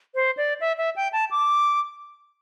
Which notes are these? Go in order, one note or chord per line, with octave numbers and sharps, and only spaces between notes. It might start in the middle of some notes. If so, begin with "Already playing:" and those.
C5
D5
E5
E5
G5
A5
D6